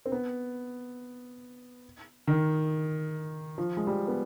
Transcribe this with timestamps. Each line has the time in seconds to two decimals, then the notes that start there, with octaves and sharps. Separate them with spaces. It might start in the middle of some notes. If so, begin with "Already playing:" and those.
0.06 C4
0.12 B3
2.27 D#3
3.58 F3
3.77 G#3
3.87 G3
4.08 B3